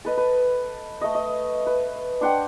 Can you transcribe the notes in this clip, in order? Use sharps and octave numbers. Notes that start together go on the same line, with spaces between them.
A4 B4 D#5
B4
A3 D#5
D#5
B4
D4 C5 F#5 G5